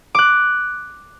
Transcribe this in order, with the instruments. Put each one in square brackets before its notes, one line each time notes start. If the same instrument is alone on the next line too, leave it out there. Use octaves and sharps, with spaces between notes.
[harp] D6 F#6